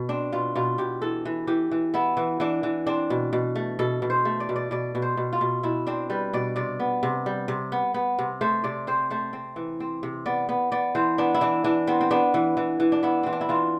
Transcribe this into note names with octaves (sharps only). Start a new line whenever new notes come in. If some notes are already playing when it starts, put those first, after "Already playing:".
Already playing: B2
C4 D4
B2 F4
B2 F4
B2 G4
E3 A4
E3
E3 G4
E3
B3 E4
E3
E3 D4
E3
C4 D4
B2
B2
A3
B2 A4
B2
C5
A3
D5
B2
D5
B2 D5
B2
C5
B2
F4
B2
B2 E4
C4 D4
G3 B4
B2 D5
C3 D5
B3
C3
G3
C3
B3
B3
C3
A3 C5
C3 D5
C4 C5
A3 C5
C4
E3
C4
C3
B3 D5
B3
B3 D5
E3 C5
B3 D4
E4
E3 D4
E3 D4
B3 C4
C4
B3 D4
E3
E3
E3
D4
B3 E4
E3 C4
D4
E4
E3 F4